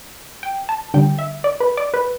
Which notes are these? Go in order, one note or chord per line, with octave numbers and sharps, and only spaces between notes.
G5
A5
D3 G3 G5
E5
D5
B4
D5
B4